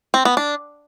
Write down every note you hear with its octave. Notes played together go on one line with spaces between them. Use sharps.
C4
B3
D4